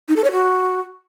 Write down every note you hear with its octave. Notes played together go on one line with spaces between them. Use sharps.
D#4
A4
C#5
F#4